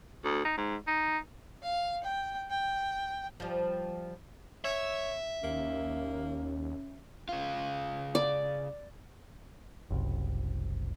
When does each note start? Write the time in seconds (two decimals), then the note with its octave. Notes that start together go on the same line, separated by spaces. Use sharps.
0.24 D2
0.45 D#4
0.57 G#2
0.87 D#4
1.62 F5
2.03 G5
2.50 G5
3.40 F3 G3
4.64 C#5 E5
5.44 D#2 A#3 C#4
7.29 C#3 F4
8.15 D5
9.90 F#1 C2